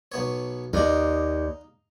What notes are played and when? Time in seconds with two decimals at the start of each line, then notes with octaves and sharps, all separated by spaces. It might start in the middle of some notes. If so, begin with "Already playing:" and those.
0.12 B1 B3 C#5
0.73 D#2 D#4 D5 D#5 F5